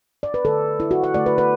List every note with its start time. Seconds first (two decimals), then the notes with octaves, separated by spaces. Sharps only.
0.23 D5
0.34 B4
0.44 D3 A3 A4
0.80 E4
0.91 F#4
1.04 F#5
1.14 D3 A3 D5
1.26 B4
1.38 B4